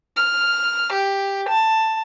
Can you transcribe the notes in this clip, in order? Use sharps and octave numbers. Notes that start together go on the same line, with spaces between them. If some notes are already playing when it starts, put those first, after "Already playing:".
F6
G4
A5